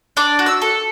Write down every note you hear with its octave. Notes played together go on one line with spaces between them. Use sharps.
D4 D6
F#4
E6
A4